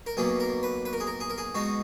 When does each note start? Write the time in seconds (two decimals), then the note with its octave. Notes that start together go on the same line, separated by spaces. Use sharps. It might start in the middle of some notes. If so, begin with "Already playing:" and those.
0.06 A#4
0.17 B1 B2 F#3 A#3 G#4
0.40 A#4
0.63 B4
0.85 B4
0.93 A#4
1.00 G#4
1.07 A#4
1.20 G#4
1.30 A#4
1.38 G#4
1.55 B2 G#3 D#4 F#4